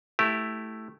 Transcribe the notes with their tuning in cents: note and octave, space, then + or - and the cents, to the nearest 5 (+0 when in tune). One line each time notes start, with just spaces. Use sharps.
A3 +0 E4 +0 G4 +0